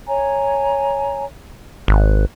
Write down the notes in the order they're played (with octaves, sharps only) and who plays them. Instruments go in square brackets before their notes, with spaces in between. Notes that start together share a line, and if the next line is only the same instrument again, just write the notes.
[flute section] C#5 G#5 A#5
[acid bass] G#1 [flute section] F#6